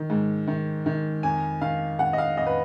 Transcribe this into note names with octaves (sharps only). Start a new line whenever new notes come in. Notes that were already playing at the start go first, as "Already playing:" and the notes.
Already playing: D#3
G#2
D#3
D#3
F2 G#5
D#3 F5
F2 F#5
D#5
F5
F2 D#5
B4